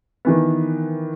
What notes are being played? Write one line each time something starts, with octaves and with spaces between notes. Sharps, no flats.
D#3 E3 B3